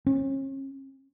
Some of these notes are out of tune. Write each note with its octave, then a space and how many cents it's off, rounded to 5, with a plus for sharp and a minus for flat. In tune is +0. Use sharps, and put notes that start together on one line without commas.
C#4 -40